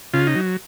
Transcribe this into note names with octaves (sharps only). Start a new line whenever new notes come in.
C#3 F4
D#4
F#3